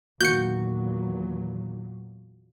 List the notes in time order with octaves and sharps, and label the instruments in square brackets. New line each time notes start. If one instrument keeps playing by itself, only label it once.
[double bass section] E2 A#2 F#3 [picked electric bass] D#3 A#3 [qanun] F#4 [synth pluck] G6 C#7